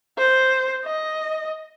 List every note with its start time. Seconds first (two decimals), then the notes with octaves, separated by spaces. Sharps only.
0.18 C5
0.85 D#5